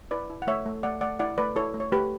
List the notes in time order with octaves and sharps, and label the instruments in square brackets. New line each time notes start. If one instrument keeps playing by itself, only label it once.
[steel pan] E4 B4 D5
E4
F#5
A3 C#5 E5
A3
A3 D5 F#5
A3 D5 F#5
E4 D5 F#5
A3 B4 D5
E4 A4 C#5
A3
C#5
A3 G4 B4